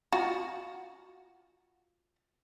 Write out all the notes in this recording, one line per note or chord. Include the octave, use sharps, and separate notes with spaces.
F4 F#4